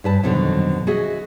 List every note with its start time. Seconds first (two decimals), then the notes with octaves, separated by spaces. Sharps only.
0.04 G2 B4 A5
0.23 F2 B2 D3 D#3 F#3
0.87 F#4 G#4 D#5 E5